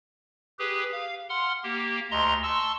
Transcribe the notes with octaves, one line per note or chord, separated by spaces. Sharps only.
G4 G#4 B4
F5
F#5 C6 F6
A#3 G4
D2 D#5 A#5 C6
A5 C6 C#6 E6